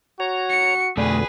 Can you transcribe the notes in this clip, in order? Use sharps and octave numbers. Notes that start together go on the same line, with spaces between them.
F#4 C#5 A#5
C#7
F2 B2 D3 A3 G#4 B4 D5